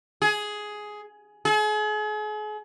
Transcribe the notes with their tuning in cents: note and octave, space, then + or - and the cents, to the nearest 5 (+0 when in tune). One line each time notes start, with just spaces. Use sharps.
G#4 +10
G#4 +40